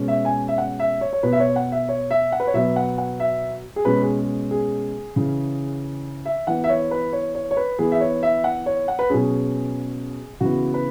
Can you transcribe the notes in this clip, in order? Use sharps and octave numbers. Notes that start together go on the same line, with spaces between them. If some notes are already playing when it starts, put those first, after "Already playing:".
Already playing: B2 G#3 C#4
E5
G#5
E5
F#5
E5
C#5
C#5
B2 B3 B4
E5
C#5
F#5
E5
C#5
E5
F#5
B4
C#5
B2 F#3 B3 E5
F#5
F#5
E5
G#4
B2 G#3 C#4 B4
G#4
G#4
C#3 E3 C#4
E5
E3 B3 F#5
E5
C#5
B4
C#5
C#5
C#5
B4
E3 B3 G#4
E5
C#5
E5
F#5
C#5
F#5
B4
B2 F#3 C#4 G#4
C#3 E3 B3 F#4
B4